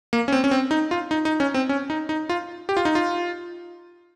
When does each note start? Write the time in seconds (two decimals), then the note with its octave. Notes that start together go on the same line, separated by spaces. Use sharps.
0.13 A#3
0.28 C#4
0.32 C4
0.44 C#4
0.51 C4
0.71 D#4
0.91 F4
1.11 D#4
1.25 D#4
1.40 C#4
1.54 C4
1.69 C#4
1.90 D#4
2.09 D#4
2.29 F4
2.69 G4
2.77 F4
2.85 D#4
2.95 F4